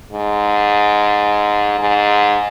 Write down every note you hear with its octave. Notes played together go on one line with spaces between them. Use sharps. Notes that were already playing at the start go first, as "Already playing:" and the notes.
G#2
G#2